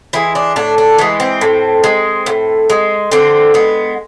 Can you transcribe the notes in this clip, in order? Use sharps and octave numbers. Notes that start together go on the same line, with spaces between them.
E3 G#3 E4
D4
A2 D4
D4
E3 G#3 B3
C4
A2
G#3
A2
G#3
D3 C4
G#3 B3